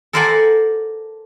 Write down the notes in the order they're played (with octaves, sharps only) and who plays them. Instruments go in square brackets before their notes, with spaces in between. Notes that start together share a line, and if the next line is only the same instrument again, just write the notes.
[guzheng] A4 A#4 C5 D5 F#5 G#5